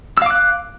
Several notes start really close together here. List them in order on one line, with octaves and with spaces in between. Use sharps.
E6 F5 D6 F#6